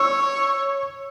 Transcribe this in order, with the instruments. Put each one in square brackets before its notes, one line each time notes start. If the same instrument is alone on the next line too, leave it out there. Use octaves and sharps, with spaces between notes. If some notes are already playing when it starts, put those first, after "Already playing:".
Already playing: [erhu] C#5 [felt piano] C#6 E6